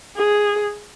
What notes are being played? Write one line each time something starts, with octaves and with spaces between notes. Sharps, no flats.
G#4